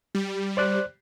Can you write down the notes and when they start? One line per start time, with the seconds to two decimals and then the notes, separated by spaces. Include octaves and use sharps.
0.15 G3
0.57 C5 D5 F#6